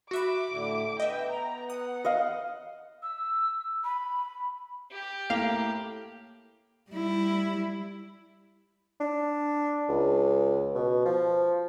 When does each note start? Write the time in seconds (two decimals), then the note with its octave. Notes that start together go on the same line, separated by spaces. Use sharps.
0.11 F#4 E5 B5 D6
0.51 A2 D3 E4
1.00 B3 D#5 E5 G5
1.31 A#5
1.70 F#5 D#6
2.05 D#5 F5
3.03 E6
3.84 B5
4.91 G4
5.30 A2 A#3 F5
6.90 G3 E4
9.01 D4
9.89 C#2
10.75 B2
11.05 F3